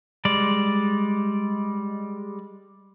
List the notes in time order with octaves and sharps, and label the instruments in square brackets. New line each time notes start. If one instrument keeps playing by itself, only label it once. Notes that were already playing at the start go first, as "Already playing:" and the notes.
[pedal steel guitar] G3 G#3 D5